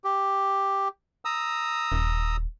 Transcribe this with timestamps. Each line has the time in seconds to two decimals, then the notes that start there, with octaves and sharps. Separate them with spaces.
0.04 G4
1.25 A#5 D#6 E6
1.92 D#1